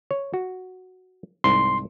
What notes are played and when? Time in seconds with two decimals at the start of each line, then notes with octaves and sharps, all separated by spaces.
0.11 C#5
0.34 F#4
1.44 C2 G#2 C6